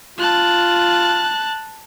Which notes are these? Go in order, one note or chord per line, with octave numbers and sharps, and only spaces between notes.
F4 A5 F#6